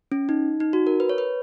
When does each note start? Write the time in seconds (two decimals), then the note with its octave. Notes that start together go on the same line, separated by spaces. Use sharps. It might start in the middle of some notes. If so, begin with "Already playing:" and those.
0.12 C#4
0.29 D#4
0.60 D#4
0.73 F#4
0.87 A#4
1.00 B4
1.09 C#5
1.18 B4